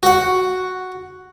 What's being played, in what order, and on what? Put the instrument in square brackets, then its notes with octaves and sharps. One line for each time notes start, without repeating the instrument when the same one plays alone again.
[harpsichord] F#4 F#5